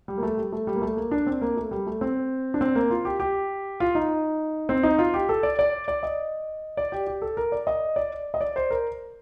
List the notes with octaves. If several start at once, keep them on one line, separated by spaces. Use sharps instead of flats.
G3
A#3
A3
G3
A3
G3
A#3
A3
A#3
D4
C4
A#3
A3
G3
A3
C4
D4
C4
A#3
F4
G4
G4
F4
D#4
C4
D#4
F4
G4
A4
D5
D5
D5
D#5
D5
G4
G4
A4
A#4
D5
D#5
D5
D#5
D5
C5
A#4